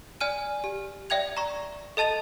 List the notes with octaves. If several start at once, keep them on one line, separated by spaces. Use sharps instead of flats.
D5 G#5 F6 D#7
G4
D5 E5 G5 G#6 F7
A#5 C#6
A4 D#5 A5 A6 F7